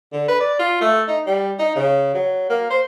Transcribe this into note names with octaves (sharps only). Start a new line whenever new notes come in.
D3
B4
D5
F4
A3
D#4
G3
D#4
C#3
F#3
A#3
C5